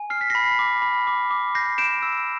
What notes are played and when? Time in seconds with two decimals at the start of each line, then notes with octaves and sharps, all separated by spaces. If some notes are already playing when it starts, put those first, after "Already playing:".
Already playing: G#5
0.10 F6 C7
0.21 B6
0.30 B5 A#6 C7
0.59 D6
0.82 B5
1.07 D6
1.31 D6
1.55 G6 A#6 C7
1.78 G6 D7 E7
2.02 E6